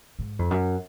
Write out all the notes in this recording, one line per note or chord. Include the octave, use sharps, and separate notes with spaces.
G#2
F2
F#2